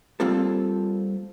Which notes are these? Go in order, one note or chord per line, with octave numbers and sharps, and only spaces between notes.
G3 A#3 C4 F4 A4